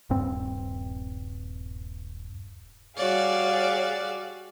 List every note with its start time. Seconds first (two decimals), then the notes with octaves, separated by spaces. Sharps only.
0.10 D#1 G2 C4
2.97 G3 F#4 G#4 C#5 D5 F5